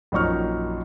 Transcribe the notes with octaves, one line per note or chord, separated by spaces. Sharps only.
A#1 F#2 D#4 C#6 F6